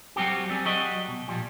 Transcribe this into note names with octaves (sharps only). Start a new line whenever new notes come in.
F#3 G3 C4 F#4 G4
G3 C4 G#4
F#3 G3 F#4 G4 D#5
B2
A#2 F3 G3